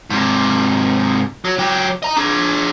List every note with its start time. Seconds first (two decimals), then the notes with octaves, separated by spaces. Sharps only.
0.10 G#2 C3
1.45 F#3
1.59 F#3 G4
2.03 D#5 A#5
2.17 D4 G#4